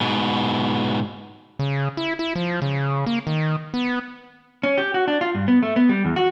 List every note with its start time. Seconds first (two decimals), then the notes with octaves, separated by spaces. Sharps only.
0.01 G#2 B2
1.59 C#3
1.97 E4
2.19 E4
2.36 F3
2.62 C#3
3.06 A#3
3.27 D#3
3.74 B3
4.63 C#4
4.78 G4
4.94 F#4
5.08 D4
5.21 F4
5.35 G2
5.48 B3
5.63 A3
5.76 B3
5.89 G3
6.05 E2
6.16 F#4